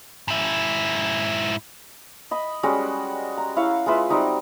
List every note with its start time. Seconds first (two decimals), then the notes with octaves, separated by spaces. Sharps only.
0.28 G#2 E4
2.31 D#5 B5
2.63 G3 G#3 C#4 F#4
3.37 A#5
3.56 E4 F#4 C#5 F5
3.86 G#3 F4 B4 E5
4.10 G3 C4 D#4 F#4